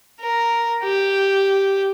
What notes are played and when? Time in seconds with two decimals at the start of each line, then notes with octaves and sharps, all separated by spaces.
0.21 A#4
0.84 G4